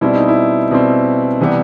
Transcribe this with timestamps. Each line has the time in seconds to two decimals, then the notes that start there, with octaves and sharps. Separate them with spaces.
0.01 B2 G3 C4 E4
0.15 D#4
0.28 E4
0.71 B2 G3 C4
1.41 C3 E3 G3 B3